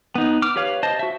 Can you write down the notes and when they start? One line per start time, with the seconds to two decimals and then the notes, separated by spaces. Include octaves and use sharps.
0.15 B3 D#4
0.42 D6 F6
0.56 G4 B4 C#5 F5
0.83 C5 D#5 A5
0.99 F#4 E5